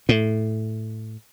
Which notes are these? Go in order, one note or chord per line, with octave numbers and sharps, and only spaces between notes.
A2